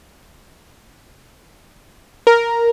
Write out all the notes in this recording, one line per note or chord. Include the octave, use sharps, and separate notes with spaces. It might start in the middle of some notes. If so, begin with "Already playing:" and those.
A#4